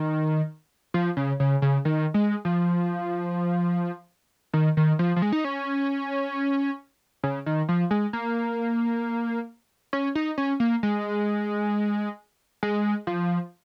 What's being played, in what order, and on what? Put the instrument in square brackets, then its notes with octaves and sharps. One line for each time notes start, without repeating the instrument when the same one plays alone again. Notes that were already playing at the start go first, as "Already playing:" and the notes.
Already playing: [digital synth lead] D#3
F3
C#3
C#3
C#3
D#3
G#3
F3
D#3
D#3
F3
F3
G#3
D#4
C#4
C#3
D#3
F3
G#3
A#3
C#4
D#4
C#4
A#3
G#3
G#3
F3